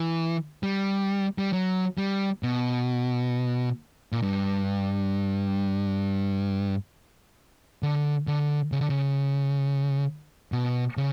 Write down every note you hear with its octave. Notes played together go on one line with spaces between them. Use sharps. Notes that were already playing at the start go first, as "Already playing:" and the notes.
Already playing: E3
G3
G3
F#3
G3
B2
A#2
G2
D3
D3
C#3
D3
C#3
B2
C#3